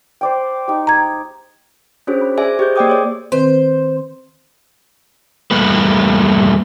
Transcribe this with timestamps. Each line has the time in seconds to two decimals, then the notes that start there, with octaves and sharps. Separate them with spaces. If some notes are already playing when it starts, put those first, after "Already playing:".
0.21 C5 D5 G5
0.68 D#4 G4
0.87 A#5 G#6
2.07 C#4 D4 F#4 G#4 C5 C#5
2.21 B5
2.38 G#4 C5 D5 E5 G#5
2.59 G4 G#4 C5 D#5 G6
2.76 A#3 D5 D#5 G5 D6 D#6
2.88 G#4 C#5 D5
3.32 D#3 C4 B4 C5
5.51 E2 G3 A3 A#3 B4